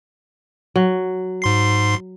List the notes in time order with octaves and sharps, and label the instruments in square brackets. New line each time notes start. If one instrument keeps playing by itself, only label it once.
[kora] F#3
[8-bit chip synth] G#2 C6 C7